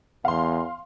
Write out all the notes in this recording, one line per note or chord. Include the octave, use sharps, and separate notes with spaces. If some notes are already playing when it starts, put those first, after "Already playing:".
E2 F5 C6